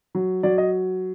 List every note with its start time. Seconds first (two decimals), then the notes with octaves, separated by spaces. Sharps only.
0.15 F#3
0.43 F#3 D5
0.58 D#5